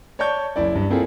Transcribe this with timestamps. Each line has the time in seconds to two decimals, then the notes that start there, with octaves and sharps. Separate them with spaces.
0.19 C#5 D5 A5 C#6 G6
0.56 F#1 E4 D5
0.75 G2
0.90 A#3 C4 E4 F4 G#4 A4